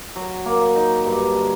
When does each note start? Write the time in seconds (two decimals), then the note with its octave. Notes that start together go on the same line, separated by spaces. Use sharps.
0.16 F#3
0.45 A#3
0.76 D#4
1.05 G2
1.35 D3